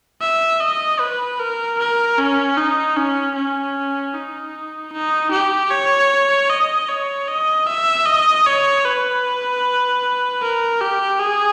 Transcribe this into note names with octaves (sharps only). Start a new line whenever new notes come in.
E5
D#5
B4
A#4
A#4
C#4
D#4
C#4
C#4
D#4
D#4
G4
C#5
D#5
C#5
D#5
E5
D#5
C#5
B4
A#4
G4
G#4